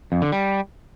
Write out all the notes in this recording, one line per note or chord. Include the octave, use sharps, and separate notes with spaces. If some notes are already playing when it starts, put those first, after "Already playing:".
F2
D3
G3